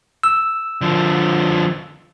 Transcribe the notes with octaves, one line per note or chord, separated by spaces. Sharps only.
E6
D3 F3